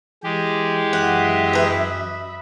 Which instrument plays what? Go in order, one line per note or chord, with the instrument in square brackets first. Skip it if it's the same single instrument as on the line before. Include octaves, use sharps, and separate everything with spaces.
[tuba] E3 [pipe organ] G#3 G4
[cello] F#2 E5 [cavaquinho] F#5
[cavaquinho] B4 D#5